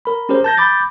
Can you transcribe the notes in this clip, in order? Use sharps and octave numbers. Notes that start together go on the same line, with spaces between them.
A#4 B5
C#4 G4 G#4 A#4 C5
A5 G6 A#6
B5 D6 G6 A6